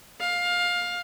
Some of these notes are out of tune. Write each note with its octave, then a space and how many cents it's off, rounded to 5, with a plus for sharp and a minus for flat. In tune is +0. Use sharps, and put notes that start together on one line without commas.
F5 +20